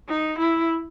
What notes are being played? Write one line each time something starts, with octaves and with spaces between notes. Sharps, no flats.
D#4
E4